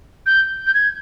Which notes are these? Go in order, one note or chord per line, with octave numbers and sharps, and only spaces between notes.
G6
G6
G#6